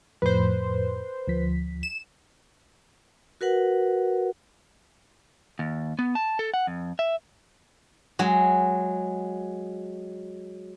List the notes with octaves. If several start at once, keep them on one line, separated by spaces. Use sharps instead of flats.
F2 A2 F3 B4 C5
D2 F3 B6
E7
F#4 A#4 B4 F#5
D#2
B3
A5
A4
F#5
F2
E5
F#3 G#3